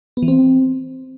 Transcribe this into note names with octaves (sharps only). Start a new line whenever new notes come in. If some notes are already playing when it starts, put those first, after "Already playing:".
B3
E3
C4